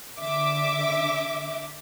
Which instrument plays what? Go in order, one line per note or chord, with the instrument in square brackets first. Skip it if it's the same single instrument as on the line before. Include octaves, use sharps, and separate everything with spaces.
[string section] D3 E5 D6